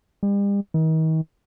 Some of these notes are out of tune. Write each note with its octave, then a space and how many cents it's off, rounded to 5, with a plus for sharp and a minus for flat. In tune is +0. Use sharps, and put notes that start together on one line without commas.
G3 +40
D#3 +40